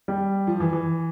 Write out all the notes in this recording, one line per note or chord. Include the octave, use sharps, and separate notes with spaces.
G3
F3
E3
E3